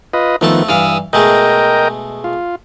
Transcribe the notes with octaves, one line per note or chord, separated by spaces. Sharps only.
F4 B4 D#5
F2 D#3 F3 A3 B3 A4
G2 E3 F5 D#6 E6
B2 G#3 A3 A#4 D#5 G5
F4